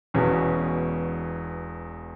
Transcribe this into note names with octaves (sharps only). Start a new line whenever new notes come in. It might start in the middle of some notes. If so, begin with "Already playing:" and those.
E1 E2 B2 C#4